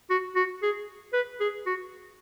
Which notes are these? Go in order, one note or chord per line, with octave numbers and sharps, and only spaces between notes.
F#4
F#4
G#4
B4
G#4
F#4